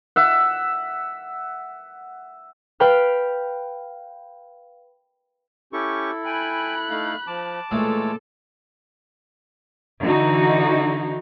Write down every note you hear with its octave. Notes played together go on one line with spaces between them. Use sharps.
E5 F#5
B4 F5 G5 B5 F6
C#4 E4 G4 A4 C#6
G5 G#5 B5 F#6
A3 D#4 F5
F3 A5 D6
A#2 E3 G#3 A3 A4 C#5 E6
D3 E3 D#4 F#4